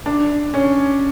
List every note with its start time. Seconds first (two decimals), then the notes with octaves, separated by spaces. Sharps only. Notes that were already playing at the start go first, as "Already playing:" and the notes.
0.06 D4
0.54 C#4